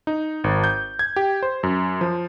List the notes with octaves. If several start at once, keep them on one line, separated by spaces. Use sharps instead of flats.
D#4
G#1
G6
G#6
G4
C5
F#2
F3